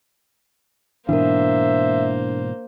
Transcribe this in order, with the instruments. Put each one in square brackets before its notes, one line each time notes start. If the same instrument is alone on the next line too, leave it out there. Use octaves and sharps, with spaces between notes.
[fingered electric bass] G#2 B2 E3 [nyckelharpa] A#3 C5 [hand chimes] D4 A#4 [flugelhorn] E5